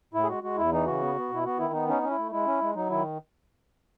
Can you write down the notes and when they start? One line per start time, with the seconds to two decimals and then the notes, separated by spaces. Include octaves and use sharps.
0.14 A2 E4
0.23 G#4
0.28 G#3 F#4
0.43 G#3 F#4
0.57 E2 E4
0.72 E3 D#4
0.86 C#3 F#4
1.01 B3
1.16 B3
1.30 B2 E4
1.45 B3 F#4
1.59 D#3 E4
1.73 B3 D#4
1.89 C#4 D#4
2.03 C#4
2.10 E4
2.18 A3
2.32 G#3 E4
2.46 C#4
2.61 G#3
2.75 F#3 D#4
2.90 D#3 E4